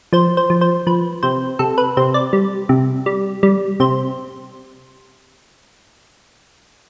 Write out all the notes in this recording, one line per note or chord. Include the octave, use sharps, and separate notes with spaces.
F3 C5
C5
F3
C5
F3 B4
C3 C5
C3 A4
B4
C3 C5
D5
G3
C3
G3
G3
C3 C5